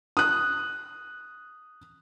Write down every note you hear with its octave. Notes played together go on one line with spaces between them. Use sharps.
D#6 F#6